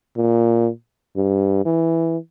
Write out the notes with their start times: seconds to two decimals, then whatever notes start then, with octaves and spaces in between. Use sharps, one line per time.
0.17 A#2
1.16 G2
1.65 E3